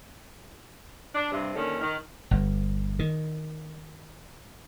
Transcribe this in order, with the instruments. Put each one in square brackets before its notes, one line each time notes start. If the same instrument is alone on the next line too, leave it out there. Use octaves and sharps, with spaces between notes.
[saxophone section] D4
G2 C3
D#2 D3 D#3 C#4 D#4
D#3
[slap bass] G1
D#3